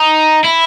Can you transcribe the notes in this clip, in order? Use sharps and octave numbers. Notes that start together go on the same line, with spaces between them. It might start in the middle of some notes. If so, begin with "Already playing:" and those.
Already playing: D#4
E4